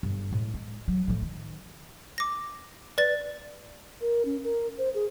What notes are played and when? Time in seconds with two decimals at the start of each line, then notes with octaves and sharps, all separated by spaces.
0.03 G1
0.31 A2 G#3
0.54 G#3
0.88 F#3
1.07 A2 F3
1.22 D#3
2.18 D6 A#6
2.98 B4 D5 A6
4.01 A#4
4.25 C#4
4.44 A#4
4.78 C5
4.94 G#4